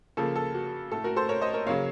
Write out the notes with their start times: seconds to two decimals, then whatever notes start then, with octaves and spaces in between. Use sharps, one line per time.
0.17 C#3 F3 A#3 A4
0.36 A4
0.54 F#4
0.91 A2 A3 A4
1.04 F#4 A#4
1.16 A4 C5
1.29 A#4 C#5
1.41 C5 D#5
1.54 A#4 C#5
1.66 C#3 F#3 A#3 C#5 F5